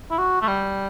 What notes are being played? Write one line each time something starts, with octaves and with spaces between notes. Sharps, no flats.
E4
F#4
A3
G3